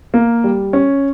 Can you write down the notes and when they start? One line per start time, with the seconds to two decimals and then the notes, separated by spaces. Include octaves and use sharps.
0.14 A#3
0.44 G3
0.73 C#4